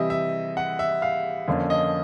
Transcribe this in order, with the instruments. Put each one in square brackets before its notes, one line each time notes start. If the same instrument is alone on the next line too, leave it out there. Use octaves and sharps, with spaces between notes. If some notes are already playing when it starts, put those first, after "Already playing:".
Already playing: [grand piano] C3 E3 G3 D#5 E5
E5
F#5
E5
F5
F2 D3 F3 A#3 C#4
D#5